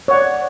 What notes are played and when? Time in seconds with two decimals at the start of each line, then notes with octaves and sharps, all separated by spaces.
0.08 C#5
0.11 F#5
0.13 D5